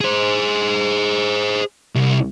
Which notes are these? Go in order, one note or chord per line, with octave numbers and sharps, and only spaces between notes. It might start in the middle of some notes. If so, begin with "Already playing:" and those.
G#4 C5
C2